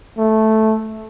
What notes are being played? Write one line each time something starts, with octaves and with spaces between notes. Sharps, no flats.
A3